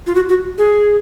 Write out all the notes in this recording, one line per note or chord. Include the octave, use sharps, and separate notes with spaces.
F4
F#4
F#4
G#4